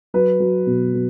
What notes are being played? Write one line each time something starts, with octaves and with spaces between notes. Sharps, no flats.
F#3 B4
F#3
B2
F#3